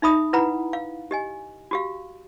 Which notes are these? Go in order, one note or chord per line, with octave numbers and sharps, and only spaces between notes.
D#4 E5 B5 D#6
E4 B4 F#5 A#5 B5
F5
G4 D#5 G#5
F#4 G4 F5